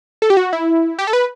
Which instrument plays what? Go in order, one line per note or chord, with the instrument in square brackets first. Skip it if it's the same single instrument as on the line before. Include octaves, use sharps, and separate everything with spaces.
[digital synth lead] A4
G4
F#4
E4
G4
A4
B4